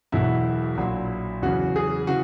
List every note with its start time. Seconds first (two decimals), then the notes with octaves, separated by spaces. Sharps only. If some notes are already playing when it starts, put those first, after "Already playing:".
0.12 E1 E2 B2 F#3 E4
0.77 A#1 A#2 F#3
1.42 E2 C#3 F#3 F#4
1.76 G#4
2.07 C#3 E3 F#4